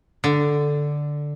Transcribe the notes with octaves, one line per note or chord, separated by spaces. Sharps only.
D3